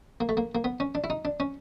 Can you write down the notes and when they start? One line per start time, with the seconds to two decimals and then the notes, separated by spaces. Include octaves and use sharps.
0.21 A#3
0.29 A3
0.37 A#3
0.55 A#3
0.64 B3
0.80 C#4
0.95 D4
1.04 E4
1.10 D#4
1.25 D4
1.40 C#4